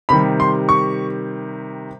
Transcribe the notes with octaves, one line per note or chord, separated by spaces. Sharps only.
C3 D#3 G3 B5
C6
C#6